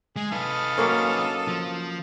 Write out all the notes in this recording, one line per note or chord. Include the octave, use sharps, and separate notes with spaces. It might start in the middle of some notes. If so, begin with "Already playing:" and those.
G#3 G#4
D#4 A4 B4 F5 D#6
F#3 A#3 C#4
F3